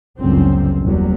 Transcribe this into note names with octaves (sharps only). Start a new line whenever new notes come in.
G1 C#2 F#2 C4
F#1 E2 F#3 G3